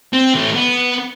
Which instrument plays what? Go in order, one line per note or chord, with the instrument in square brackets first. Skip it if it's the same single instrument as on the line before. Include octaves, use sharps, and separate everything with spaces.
[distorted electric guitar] C4
E3 A3
B3